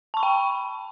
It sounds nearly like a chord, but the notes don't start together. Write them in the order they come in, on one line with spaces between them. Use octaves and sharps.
A5 C#6 B5 G5